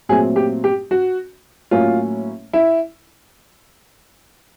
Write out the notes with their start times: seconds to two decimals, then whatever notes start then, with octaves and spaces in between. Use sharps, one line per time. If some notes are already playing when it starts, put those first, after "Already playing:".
0.09 A#2 F#3 A3 C4 G#4
0.36 G4
0.64 G4
0.91 F#4
1.71 A2 F#3 A#3 C#4 F4
2.53 E4